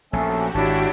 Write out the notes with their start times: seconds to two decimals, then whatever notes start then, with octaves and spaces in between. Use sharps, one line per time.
0.13 A#1 A3 C#4 F#4 G4 A4
0.55 G#1 D4 E4 C#5 A5